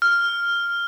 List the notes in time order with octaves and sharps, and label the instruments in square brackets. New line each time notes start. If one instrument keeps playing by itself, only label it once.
[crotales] F6